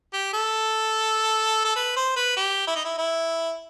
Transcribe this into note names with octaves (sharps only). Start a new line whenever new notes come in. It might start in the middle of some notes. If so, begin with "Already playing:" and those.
G4
A4
A4
B4
C5
B4
G4
E4
D#4
E4
E4